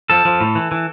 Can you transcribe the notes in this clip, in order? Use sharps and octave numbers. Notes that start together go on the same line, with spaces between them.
F3 A4
F3
A2
E3
E3